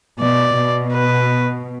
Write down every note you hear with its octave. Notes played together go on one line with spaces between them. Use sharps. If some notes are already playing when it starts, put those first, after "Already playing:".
B2 D5
B2
B4